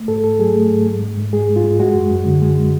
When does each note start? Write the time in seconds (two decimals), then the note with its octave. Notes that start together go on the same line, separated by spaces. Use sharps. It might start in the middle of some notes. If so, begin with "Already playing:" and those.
Already playing: A3
0.08 G#2 A4
0.24 G#2 A4
0.39 F#3 G#4
0.55 A3
0.71 G#2
0.86 G#2
1.02 G#3
1.17 G#2
1.33 G#3 G#4
1.48 G#2
1.56 F4
1.64 G#3
1.80 G#3 F#4
1.95 F#2
2.11 F#2
2.25 D3
2.42 G#3